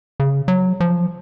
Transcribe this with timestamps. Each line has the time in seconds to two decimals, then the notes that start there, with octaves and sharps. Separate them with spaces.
0.20 C#3
0.48 F#3
0.80 F3